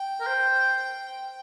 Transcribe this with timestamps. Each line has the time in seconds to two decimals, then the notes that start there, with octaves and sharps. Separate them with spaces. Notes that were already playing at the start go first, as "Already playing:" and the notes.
Already playing: G5
0.20 A#4
0.27 C5